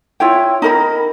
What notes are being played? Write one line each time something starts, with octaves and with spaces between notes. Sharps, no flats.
E4 F4 C#5 G5
D#4 A#4 B5